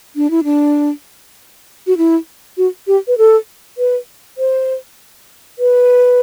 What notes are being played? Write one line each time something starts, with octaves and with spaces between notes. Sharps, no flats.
D4
E4
D4
F#4
E4
F#4
G4
B4
A4
B4
C5
B4